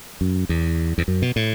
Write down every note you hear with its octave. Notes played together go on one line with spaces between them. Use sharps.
F#2
E2
E2
F#2
B2
A2